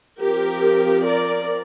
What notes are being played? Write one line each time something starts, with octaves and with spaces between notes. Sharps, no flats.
F3 C4 G4 A#4
A#4 D5